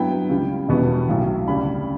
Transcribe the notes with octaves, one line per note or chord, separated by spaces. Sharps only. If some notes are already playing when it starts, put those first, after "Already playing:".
Already playing: G2 F#3 B3 E4 G5
C#2 C#3 G3
E1 E2 B2 G3 B3
B1 A2 F#3
D2 C#3 G3 D4 B5